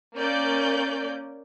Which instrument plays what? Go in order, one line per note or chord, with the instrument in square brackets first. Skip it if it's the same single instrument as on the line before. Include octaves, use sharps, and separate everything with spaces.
[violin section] A#3 C#4 D5 G6